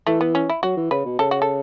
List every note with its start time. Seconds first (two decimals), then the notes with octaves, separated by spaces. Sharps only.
0.07 E3 A3
0.21 B3
0.35 C#4
0.50 E4
0.63 F#3 F#4
0.77 E3
0.91 C#3 B4
1.05 B2
1.19 C#3 A4
1.31 F#4
1.42 A4